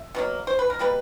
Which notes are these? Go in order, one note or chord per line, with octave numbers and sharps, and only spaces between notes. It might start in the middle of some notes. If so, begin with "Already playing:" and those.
Already playing: E5
B2 F#3 A#3
C5
B4
A#4
B2 G3 A#3 B4